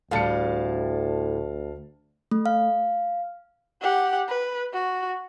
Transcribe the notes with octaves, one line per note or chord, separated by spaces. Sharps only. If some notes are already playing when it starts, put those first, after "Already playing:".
D2 A2 G3 F5 A5 C#7
A3
F5
G4 F#5
B4
F#4